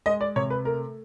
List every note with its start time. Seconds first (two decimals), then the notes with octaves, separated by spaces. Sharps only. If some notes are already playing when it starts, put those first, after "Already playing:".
0.06 G#3 D#5
0.21 D5
0.36 C3 C#5
0.50 B4
0.65 A3 A#4